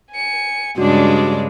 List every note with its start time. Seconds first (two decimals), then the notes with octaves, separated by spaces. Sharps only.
0.12 G#5 C#7
0.78 G2 C#3 G#3 D4 F#4 D5